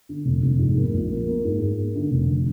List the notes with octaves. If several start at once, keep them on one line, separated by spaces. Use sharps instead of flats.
D3
F1
F1
G#2
A#3
A#1
A#3
A#3
G#2
G#2
A#3
D3
F1